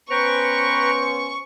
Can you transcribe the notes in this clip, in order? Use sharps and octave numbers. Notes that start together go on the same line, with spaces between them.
B3 C#4 B4 C5 G5 A#5 C#6